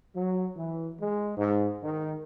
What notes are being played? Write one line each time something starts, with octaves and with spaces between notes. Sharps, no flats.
F#3
E3
G#3
G#2
D#3